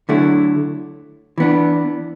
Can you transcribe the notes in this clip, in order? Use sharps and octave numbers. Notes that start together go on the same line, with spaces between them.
D3 F#3 A3 E4
E3 B3 D4